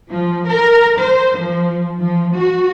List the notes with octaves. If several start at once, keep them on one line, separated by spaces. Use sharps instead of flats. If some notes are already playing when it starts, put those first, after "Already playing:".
F3
A#4
C5
F3
F3
F#4